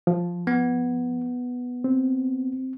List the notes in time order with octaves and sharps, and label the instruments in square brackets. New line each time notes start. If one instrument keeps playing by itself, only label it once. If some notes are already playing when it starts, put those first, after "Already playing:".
[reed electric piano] F3
[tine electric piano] B3
[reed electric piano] C4